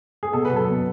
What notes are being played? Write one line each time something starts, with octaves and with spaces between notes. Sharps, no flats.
G#4
B2 A4
B4
F#3
A4
B2